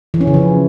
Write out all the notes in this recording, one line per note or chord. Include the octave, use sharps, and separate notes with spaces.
E3
C#4
C#3
F3